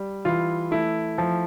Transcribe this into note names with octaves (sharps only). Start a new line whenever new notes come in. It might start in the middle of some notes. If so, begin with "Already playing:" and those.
Already playing: G3
E3 F4
A3 E4
F3